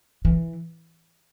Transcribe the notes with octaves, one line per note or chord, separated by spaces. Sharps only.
E3